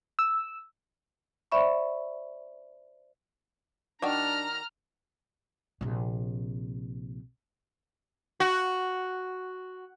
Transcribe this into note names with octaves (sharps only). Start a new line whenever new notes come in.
E6
C5 D5 E5 B5 C#6
D#3 D4 F#4 D5 A#5 F6
A#1 C3
F#4